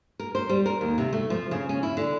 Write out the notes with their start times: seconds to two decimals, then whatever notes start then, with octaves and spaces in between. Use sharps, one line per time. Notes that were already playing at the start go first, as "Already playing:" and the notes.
0.20 A#4
0.35 C5
0.49 G3
0.66 A#4
0.81 D#2
0.98 C3
1.13 A3
1.30 F3
1.51 C#3
1.69 C#4
1.83 E4
1.97 D3